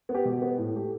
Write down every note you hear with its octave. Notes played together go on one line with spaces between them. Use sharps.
B3
G4
B2
B3 G4
A2
A3 G4